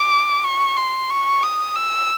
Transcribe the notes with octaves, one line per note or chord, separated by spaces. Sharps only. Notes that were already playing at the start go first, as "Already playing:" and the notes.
Already playing: D6
C#6
C6
C#6
D#6
E6